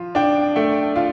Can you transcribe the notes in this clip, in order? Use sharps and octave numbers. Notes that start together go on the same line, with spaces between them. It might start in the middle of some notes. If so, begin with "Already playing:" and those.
Already playing: F3 F4
D4 G5
A3 G5
F4 F5